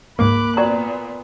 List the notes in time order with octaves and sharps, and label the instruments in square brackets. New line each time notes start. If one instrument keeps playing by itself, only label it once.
[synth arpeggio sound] C#2 G#2 [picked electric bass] A#3 [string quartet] B5 D6 F#6
[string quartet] A#2 B3 [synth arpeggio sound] C4 F#4 [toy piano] D5 A#5